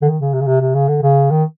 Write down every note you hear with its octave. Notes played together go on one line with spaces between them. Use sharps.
D3
D#3
C#3
C3
C#3
C3
C3
C#3
D3
C#3
D#3